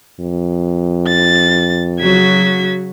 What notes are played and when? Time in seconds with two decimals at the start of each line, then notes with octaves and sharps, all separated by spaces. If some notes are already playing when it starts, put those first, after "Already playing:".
0.20 F2
1.08 A6
2.00 C#3 F#3 F#4 G#6 B6